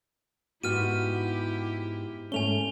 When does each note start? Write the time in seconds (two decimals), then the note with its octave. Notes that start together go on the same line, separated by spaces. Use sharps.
0.63 G#2 B3 E4 F#4 G4 F6 D#7
2.32 G#2 A3 C#4 G#5 F7 G7